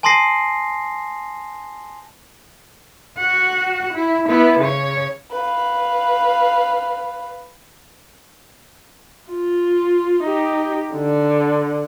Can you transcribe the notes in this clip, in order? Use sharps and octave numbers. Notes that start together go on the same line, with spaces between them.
G#5 A5 C6 D#6 A#6 C7
F#4 F#5
E4
B3 E4
C#3 C#5
B4 F5
F4
D#4 G4
D3